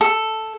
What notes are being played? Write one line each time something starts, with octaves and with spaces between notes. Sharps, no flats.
A4